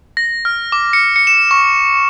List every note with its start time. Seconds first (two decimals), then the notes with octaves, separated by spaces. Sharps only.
0.17 A#6
0.45 F6
0.72 D6
0.93 C#7
1.16 C#7
1.27 E7
1.51 C#6